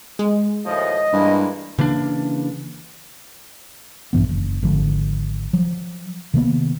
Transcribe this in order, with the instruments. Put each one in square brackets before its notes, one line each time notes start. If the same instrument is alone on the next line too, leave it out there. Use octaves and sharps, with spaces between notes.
[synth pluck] G#3
[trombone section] D#2 A2 F3 [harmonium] D#5
[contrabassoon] G2 [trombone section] E3 G#3 A#3
[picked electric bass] C#3 E3 A#3 D4
[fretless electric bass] A#1 G2 E3 B3
F#1
G#1 D3 F3
F3 F#3
C3 D#3 A#3 B3